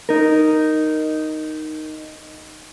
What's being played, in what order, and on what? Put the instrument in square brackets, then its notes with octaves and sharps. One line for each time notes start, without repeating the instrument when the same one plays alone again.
[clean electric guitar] D#4 A#4